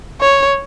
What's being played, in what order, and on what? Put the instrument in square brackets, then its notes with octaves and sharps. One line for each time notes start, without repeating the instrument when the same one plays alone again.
[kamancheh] C#5